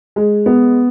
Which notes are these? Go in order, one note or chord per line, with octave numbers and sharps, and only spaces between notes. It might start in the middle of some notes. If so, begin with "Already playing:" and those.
G#3
B3